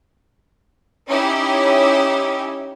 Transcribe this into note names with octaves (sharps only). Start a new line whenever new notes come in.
C#4 D#4 E4 G4